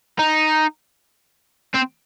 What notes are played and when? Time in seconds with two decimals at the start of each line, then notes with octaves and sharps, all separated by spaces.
0.19 D#4
1.75 C4